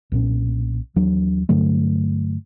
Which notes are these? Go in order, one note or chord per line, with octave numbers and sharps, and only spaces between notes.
B1 A#2 C#4
D#2 E3 F#3 D4
G2 D3 F#3 A3